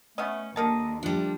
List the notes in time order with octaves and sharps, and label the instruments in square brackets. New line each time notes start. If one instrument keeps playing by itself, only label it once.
[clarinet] A3 [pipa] B3 C#4 D#5
[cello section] D#2 [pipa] D3 A#4 A5 [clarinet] D#5
[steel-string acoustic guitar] F3 G3 [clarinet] D4